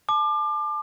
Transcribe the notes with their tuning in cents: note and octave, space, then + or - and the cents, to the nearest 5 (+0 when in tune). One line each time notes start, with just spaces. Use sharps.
A5 -30 D6 +30